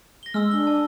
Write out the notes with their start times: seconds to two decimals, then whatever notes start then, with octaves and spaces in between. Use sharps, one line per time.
0.23 A#6 G7
0.34 G#3 E6 F6
0.51 D4 G7
0.67 A5